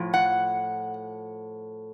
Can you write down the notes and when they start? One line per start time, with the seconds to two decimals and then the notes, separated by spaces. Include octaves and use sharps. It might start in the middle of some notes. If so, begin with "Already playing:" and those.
Already playing: A2 F3
0.14 F#5